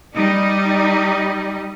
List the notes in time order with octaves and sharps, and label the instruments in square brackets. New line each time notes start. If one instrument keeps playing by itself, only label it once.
[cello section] G3 D#4